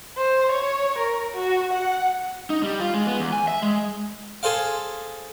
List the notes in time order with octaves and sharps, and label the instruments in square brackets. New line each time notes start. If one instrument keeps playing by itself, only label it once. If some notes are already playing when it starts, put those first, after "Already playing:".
[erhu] C5
C#5
A#4
F#4
F#5
[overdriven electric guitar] D#4
G3
F4
G#3
B3
E2
G#5
E5
G#3
[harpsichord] G#4 A4 C5 F5